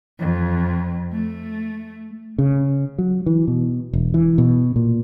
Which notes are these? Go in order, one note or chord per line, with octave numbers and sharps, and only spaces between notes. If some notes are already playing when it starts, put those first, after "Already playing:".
F2
A3
C#3
F#3
E3
B2
E1
E3
B2
A#2